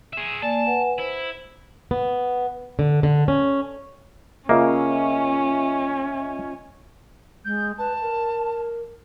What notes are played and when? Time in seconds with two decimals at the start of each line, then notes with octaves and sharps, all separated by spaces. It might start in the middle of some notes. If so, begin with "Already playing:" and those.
0.13 G#4 E5
0.42 A#3 D5 G#5 A5
0.66 B4 F#5 G#5
0.98 E4 C5
1.91 B3
2.79 D3
3.03 D3
3.28 C#4
4.49 C#3 A#3 C#4 F4 D#5 E5
7.45 G#3 G6
7.78 B4 A5
8.02 A#4